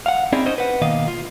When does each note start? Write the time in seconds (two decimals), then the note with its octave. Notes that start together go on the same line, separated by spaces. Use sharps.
0.06 F5 F#5
0.32 C4 C#4 D#4 E4 G#4 D5
0.46 C#4 D#4 C5 D#5
0.58 B4 F#5
0.82 B2 D#3 A#3 D#5 F5
1.08 F4